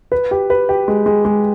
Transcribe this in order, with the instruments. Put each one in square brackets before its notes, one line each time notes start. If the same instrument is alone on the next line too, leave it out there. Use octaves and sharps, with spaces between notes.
[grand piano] B4
G4
B4
G4
G#3
G#3
G#3